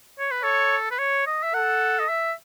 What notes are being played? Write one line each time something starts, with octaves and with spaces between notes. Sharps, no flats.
C#5
B4
A4 C#5
B4
C#5
D#5
E5
A4 F#5
D#5
E5